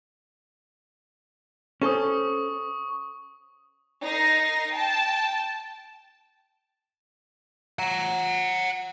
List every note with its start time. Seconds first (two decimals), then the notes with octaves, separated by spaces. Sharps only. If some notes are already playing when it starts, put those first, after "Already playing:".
1.82 C#4 A4 C5 C#6 D#6
4.03 D#4 A#4 A#6 C7
4.70 G5 A5
7.79 F#5 A#5